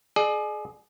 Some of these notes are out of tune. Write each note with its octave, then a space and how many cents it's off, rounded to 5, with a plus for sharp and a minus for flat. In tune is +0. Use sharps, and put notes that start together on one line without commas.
G#4 +30 D5 +40